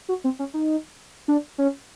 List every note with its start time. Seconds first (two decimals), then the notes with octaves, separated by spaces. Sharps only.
0.09 F#4
0.24 C4
0.39 C#4
0.54 D#4
1.28 D4
1.58 C#4